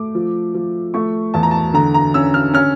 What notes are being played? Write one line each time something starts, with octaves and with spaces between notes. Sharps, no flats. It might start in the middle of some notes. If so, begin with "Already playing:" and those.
Already playing: A3 D6
F3
F3
A3 C#6
E2 A5
A#5
A5
D3 A#5
A#5
C#4 E6
F6
C#4 F6